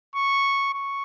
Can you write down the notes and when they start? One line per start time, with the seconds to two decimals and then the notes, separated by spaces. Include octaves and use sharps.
0.15 C#6
0.74 C#6